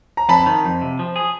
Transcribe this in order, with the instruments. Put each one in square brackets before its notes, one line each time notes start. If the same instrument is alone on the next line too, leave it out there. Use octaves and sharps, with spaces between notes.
[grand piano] A#5
[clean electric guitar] F2 [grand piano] A5 B5
[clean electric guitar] D#3
F2
C3
F3
G#4